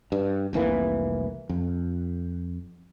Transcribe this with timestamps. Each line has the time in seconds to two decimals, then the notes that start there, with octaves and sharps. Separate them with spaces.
0.12 G2
0.53 F1 C2 E3 A#3
1.49 F2